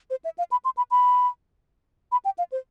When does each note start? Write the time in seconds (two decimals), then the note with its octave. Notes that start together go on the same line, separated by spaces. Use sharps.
0.10 C5
0.24 E5
0.38 F5
0.51 B5
0.65 C6
0.77 B5
0.91 B5
2.12 B5
2.25 G5
2.38 F5
2.52 C5